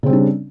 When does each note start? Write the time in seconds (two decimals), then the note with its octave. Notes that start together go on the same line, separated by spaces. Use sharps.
0.03 C#3
0.06 C4
0.10 G3
0.13 D4